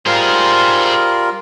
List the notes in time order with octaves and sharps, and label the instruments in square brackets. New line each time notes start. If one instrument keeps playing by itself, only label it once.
[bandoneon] G3 F4 A#4 [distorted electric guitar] G#4 C5